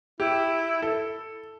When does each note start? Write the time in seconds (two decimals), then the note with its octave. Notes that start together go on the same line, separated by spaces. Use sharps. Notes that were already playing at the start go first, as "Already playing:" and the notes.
0.20 E4 G4
0.82 E4 A4